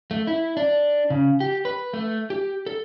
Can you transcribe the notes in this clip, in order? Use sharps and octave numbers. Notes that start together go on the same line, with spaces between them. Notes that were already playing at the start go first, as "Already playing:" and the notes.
A3
E4
D4
C#3
G4
B4
A3
G4
A4